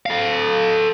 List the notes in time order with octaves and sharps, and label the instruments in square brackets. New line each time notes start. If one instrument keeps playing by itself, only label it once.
[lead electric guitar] A4 F5